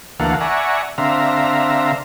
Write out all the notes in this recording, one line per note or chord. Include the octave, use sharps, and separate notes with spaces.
D2 E3 A#3 A4 F5 F#5
D5 E5 F#5 G#5 A#5 C#6
D3 C4 E5 F5 A#5